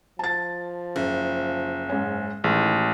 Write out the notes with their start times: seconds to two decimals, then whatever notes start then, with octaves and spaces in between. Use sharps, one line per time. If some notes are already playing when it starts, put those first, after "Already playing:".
0.19 F3 A5 A6
0.96 F#1
1.89 G#2 C#4
2.44 A1 D#3 G#3